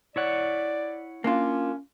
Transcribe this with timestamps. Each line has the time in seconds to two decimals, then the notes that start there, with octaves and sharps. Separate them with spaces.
0.16 E4 C#5 D5 F#5
1.24 A#3 C#4 D4 F4